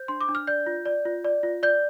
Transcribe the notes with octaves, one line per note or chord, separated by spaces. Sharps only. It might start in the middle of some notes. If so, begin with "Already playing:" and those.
Already playing: C5 G6
D4 C6
D6
D4
F6
D5 G6
F4
D5
F4
D5
F4
D5 G6